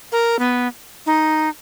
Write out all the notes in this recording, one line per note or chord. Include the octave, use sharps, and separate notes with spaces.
A#4
B3
D#4